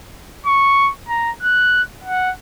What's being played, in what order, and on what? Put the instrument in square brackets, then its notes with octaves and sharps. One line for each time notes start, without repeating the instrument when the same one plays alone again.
[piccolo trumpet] C#6
A#5
F#6
F#5